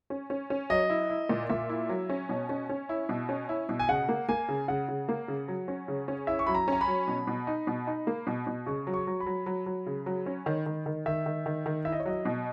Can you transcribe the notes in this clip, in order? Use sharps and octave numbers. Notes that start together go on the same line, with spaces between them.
C#4
C#4
C#4
F#3 D#5
E4
E4
A#2
A#2 E5
E4
F#3
C#4
B2
C#4
C#4
E4
B2
C#4
E4
B2
G#5
C#3 F#5
A#3
A#3 G#5
C#3
C#3 F#5
C#3
A#3
C#3
F#3
C#4
C#3
C#4
E4 E5
C#6
F#3 B5
A#5
C#4 A#5
B5
F#3
B2
B2
D#4
B2
D#4
A#3
B2
B2
C#3 C#6
F#3
C#6
F#3
B5
F#3
F#3
F#3
C#3
F#3
C#4
D#3
D#3
D#3
D#3 E5
D#3
D#3
D#3
E4 E5
D#5
C#5
F#3 D#5
B2